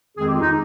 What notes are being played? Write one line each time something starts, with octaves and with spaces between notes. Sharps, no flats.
F2 D#3 G#3 C4 G#4
G4
F4
D#4